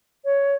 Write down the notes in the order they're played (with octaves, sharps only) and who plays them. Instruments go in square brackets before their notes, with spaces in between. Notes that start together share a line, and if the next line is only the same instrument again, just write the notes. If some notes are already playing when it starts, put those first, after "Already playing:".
[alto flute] C#5